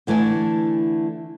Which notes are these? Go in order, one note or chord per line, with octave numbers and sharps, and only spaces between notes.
D3 E3 A3 E4 G#5